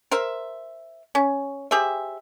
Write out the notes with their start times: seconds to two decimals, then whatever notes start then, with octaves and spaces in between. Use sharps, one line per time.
0.11 A#4 C5 E5
1.15 C#4
1.71 G4 G#4 C5 E5